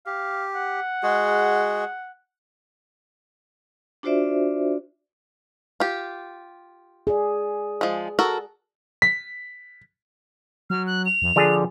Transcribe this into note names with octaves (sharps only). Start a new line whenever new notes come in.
G4 F5
F#5
G#3 F#4 G#4
D4 F4 F#4 C5 D5 E5
F4 G4
G#4 D5
F3 G#3
F#4 A4 A#4
B6
F#3 F6
F#6
F7
F2
D3 F3 D4 G#4